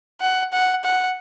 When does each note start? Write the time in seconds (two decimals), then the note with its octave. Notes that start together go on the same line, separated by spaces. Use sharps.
0.21 F#5
0.53 F#5
0.84 F#5